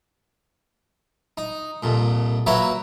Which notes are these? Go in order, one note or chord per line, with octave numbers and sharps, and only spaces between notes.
D#4
C2 F2 A#2
F#3 A#3 F#4 B4 C#5 E5